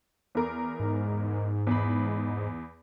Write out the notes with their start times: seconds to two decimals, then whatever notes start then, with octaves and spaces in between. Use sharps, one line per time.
0.35 E2 A#4 D6
0.80 G#2
1.67 E2 B5